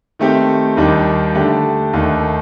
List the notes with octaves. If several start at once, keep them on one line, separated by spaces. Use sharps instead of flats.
D#3 A3 C4 G4
D#2 D#3 G3 D4
D3 A3 D4 G4
D#2 D#3 A3